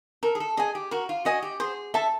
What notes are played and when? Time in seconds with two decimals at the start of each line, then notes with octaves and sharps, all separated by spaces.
0.23 A4 A#4
0.35 G#4
0.40 A4
0.57 G#4 D#5 G#5
0.75 G4
0.91 F#4 A#4
1.09 F4
1.25 F#4 D#5 G#5
1.42 G4
1.60 G#4 C5
1.94 A4 E5 A5